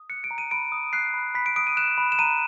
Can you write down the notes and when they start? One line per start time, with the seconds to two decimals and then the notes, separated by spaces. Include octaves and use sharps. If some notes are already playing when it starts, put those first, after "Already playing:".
Already playing: D#6
0.10 F#6 C#7
0.24 D7
0.31 A#5
0.38 D#7
0.51 B5 D7
0.72 D#6
0.93 F#6 C7
1.14 B5
1.35 B5 B6
1.46 D7
1.56 D#6 D7
1.67 D#7
1.77 F#6 E7
1.98 B5
2.12 E7
2.19 A#5 D#7